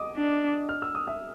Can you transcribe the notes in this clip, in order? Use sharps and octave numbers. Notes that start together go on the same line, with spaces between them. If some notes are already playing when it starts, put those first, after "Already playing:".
Already playing: D#5 D6 D#6
D4
F6
E6
D#6
E5 E6